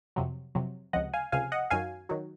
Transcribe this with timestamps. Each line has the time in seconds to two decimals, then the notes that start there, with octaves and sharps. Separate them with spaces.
0.16 F2 C3 F#3
0.55 F2 C3 F#3
0.93 C#2 C3 F3 D#5 F#5
1.13 F5 G#5
1.32 C#2 C3 F3 F5 G#5
1.52 D#5 F#5
1.70 F#2 D#3 F#3 F5 G#5
2.09 D#3 F#3